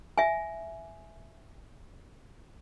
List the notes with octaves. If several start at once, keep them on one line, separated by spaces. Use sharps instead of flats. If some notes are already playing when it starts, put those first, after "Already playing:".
E5 G#5